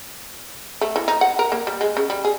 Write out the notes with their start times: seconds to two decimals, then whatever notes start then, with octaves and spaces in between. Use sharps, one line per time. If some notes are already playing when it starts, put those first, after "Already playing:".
0.81 A3
0.96 E3
1.08 D#4
1.21 F#5
1.39 A#4
1.52 A#3
1.67 G3
1.81 G#3
1.97 C#3
2.10 G3
2.25 G#4